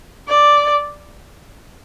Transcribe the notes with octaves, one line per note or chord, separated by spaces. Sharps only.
D5